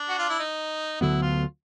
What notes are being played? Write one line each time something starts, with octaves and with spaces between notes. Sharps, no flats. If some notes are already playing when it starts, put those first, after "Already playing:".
Already playing: D4
F#4
F4
E4
D#4
D2 D3 F#3 B3 E4
F4